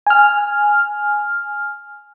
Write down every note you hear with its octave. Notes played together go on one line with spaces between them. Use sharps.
G#5 F6